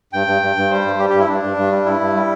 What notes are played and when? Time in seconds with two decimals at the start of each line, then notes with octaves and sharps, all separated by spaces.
0.13 G2 G5
0.27 G2
0.42 G2
0.56 G2
0.71 G3 C5
0.85 G2
0.99 G3 G4
1.10 G4
1.14 G2
1.19 E4
1.28 G2 D4
1.43 G2
1.57 G2
1.72 G3
1.85 G2 E4
2.00 G2
2.15 G3